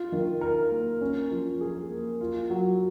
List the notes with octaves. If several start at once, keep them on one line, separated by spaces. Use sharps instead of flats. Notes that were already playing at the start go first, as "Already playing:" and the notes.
Already playing: F4
D#3
A#4
A#3
C#4
F3
G#4
A#3
F4
F#3